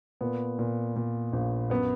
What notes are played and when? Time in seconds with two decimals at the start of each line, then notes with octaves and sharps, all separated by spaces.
0.21 A#2 B3
0.59 A#2
0.96 A#2
1.33 A#1
1.70 F#2 B3